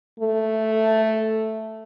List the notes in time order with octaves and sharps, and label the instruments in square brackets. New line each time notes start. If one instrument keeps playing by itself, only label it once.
[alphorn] A3